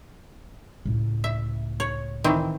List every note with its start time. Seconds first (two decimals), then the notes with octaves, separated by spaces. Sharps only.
0.85 C#2 A2
1.24 E5
1.80 C#5
2.24 D#3 E3 C4